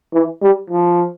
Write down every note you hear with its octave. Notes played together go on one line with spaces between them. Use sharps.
E3
G3
F3